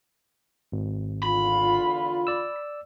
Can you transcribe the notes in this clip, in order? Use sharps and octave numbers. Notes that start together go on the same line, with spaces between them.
G#1
E2 D3 F4 B5
D5 E6